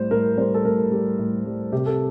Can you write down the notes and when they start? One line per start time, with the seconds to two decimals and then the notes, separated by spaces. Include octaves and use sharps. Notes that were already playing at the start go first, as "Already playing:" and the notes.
Already playing: A2 G3 C5
0.11 A2 A#4
0.38 G3 C5
0.54 A4
0.65 A2 A#4
0.92 G3
1.19 A2
1.46 G3
1.72 C3 G4
1.86 A4